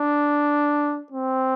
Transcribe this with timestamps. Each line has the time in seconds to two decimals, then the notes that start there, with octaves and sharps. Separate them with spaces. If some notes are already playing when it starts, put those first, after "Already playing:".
Already playing: D4
1.12 C4